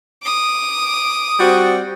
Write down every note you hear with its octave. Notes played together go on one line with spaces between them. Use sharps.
D6 D#6
G3 C4 F#4